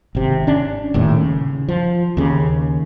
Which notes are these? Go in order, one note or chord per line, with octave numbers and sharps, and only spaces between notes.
G#1 C3
C#4 D4
D#1 D#2 A2
C#3
F3
D#2 C#3